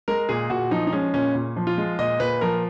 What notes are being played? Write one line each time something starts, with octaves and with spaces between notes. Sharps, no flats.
G#3 A#4
A#2 G#4
A#2 F#4
F3 D#4
D#4
G#3 C#4
A#2 C#4
A#2
F3
F4
G#3
A#2 D#5
A#2 B4
F3 A#4